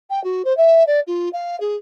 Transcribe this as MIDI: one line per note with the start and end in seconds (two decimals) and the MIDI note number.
0.10 0.22 79
0.24 0.42 66
0.45 0.55 72
0.57 0.83 76
0.87 1.00 74
1.07 1.29 65
1.33 1.58 77
1.60 1.76 68